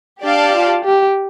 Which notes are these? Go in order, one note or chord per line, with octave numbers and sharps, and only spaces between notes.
D4 G4 D5 F5 A5
F4
G4